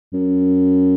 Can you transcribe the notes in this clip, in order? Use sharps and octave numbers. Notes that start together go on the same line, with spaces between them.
F#2